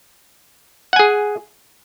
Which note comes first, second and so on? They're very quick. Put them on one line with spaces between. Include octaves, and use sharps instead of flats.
F#5 G#5 G#4